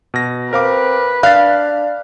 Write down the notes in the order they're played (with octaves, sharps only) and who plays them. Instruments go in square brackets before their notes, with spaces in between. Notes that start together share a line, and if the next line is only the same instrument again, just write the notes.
[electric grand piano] B2 A#6
[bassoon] C4 [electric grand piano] A#4 F5 D6 [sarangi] B4
[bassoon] D4 [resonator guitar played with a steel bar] F5 [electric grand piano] F#6 A6